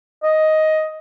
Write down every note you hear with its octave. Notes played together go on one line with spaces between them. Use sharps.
D#5